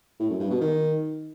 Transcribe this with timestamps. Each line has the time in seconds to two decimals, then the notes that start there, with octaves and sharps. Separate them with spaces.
0.19 A2
0.30 F#2
0.40 G2
0.50 B2
0.61 D#3